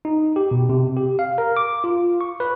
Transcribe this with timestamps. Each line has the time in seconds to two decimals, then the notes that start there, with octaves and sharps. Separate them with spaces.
0.05 D#4
0.36 G4
0.51 B2
0.69 C3
0.97 G4
1.19 F5
1.38 A#4
1.57 D6
1.84 F4
2.21 C#6
2.40 B4